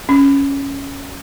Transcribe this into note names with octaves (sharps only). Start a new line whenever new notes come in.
C#4